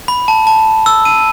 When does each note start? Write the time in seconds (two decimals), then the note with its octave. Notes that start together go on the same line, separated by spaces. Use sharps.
0.08 B5
0.28 A5
0.47 A5
0.86 E6
1.05 D#7